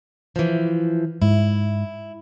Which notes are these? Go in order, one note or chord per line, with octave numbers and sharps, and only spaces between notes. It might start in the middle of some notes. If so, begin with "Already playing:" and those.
E3 F3
G#2 E4